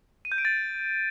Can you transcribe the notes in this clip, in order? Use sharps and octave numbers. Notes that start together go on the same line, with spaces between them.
D#7
G6
D7
A6